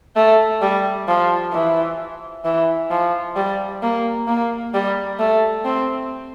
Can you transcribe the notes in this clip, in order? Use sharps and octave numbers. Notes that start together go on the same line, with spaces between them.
A3
G3
F3
E3
E3
F3
G3
A#3
A#3
G3
A3
C4